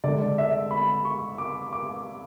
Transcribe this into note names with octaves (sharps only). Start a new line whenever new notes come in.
D3 G#3 D5
E5
B5
C#6
D6
D6